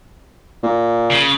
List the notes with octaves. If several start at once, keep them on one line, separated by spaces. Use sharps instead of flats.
A#2
C#3